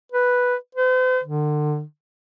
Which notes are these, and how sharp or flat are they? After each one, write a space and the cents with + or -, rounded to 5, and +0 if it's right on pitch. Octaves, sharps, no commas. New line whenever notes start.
B4 +0
C5 -45
D3 +35